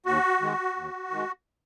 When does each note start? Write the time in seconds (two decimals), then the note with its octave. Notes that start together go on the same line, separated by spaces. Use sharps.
0.06 D#2 F#4
0.41 D#3 G#3
0.76 D#2
1.11 D#3 G#3